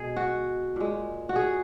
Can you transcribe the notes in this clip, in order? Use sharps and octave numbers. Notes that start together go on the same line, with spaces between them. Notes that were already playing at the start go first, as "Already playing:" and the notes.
Already playing: B2 G#3 G#4
F#4
A#2 G#3
F#4
G#4